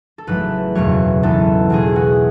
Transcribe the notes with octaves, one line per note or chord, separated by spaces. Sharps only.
A4
A1 G#2 F#3 A3 B4
F#1 E2 B2 F#3 A3 C#5
B1 A2 E3 B3 A4
E1 E2 B2 A3 C#4 G#4
F#4